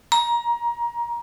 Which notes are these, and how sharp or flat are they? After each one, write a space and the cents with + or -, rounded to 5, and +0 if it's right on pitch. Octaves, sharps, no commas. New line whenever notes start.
A#5 +25